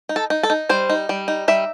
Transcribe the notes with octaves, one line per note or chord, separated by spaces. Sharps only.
D#4
A4
D#4
A4
D#4
G3 C5
D#4
G3
D#4
G3 E5